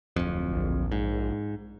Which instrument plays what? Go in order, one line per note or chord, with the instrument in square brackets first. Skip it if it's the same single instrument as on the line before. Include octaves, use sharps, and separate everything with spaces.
[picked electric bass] D1 F2
[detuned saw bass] A#1
[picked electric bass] G#2